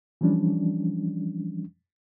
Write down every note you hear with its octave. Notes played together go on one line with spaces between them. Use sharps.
E3 F3 G3 C#4 D4